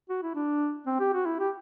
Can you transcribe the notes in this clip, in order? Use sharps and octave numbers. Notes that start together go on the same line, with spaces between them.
F#4
E4
D4
C4
G4
F#4
E4
G4